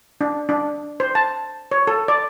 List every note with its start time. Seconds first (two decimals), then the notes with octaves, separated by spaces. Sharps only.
0.21 D4
0.49 D4
1.00 C5
1.15 A5
1.72 C#5
1.87 A4
2.08 D5